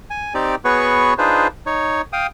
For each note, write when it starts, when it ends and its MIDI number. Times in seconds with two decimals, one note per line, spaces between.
0.10 0.34 80
0.34 0.55 60
0.34 0.55 63
0.34 0.55 67
0.34 0.55 74
0.65 1.14 59
0.65 1.14 66
0.65 1.14 68
0.65 1.14 71
0.65 1.14 73
0.65 1.14 85
1.18 1.47 62
1.18 1.47 63
1.18 1.47 65
1.18 1.47 68
1.18 1.47 71
1.18 1.47 72
1.66 2.01 63
1.66 2.01 73
2.13 2.27 77
2.13 2.27 79
2.13 2.27 87